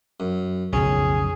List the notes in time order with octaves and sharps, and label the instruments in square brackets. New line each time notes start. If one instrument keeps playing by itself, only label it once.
[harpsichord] F#2
[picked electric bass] B1 F2 C#3 [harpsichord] C#4 [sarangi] G#4